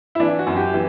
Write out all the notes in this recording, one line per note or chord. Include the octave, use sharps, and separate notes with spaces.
E4
E3 D4
F#4
F#2
G4
E3